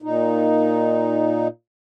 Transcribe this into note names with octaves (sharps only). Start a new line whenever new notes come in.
A#2 D#4